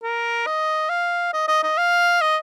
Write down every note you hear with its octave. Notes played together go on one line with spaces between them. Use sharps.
A#4
D#5
F5
D#5
D#5
D#5
F5
D#5